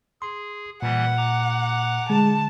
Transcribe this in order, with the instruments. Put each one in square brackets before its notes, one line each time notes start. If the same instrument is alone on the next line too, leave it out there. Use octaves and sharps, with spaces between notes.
[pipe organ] G#4 [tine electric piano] C6
[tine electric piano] A#2 [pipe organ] E3 G3 [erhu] F#5
[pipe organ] A#5 D6
[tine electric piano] D3 [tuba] G#3 [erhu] A5